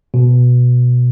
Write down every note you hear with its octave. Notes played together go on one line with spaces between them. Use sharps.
B2